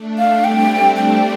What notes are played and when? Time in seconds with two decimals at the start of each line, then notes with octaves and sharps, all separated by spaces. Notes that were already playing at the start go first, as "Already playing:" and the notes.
Already playing: A3 D4
0.18 F5
0.44 G3 C4 G5
0.96 G5